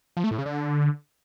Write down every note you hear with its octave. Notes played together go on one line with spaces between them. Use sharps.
F3
A3
A2
C#3
D3